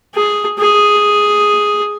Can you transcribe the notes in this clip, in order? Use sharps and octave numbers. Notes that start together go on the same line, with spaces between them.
G#4
G#4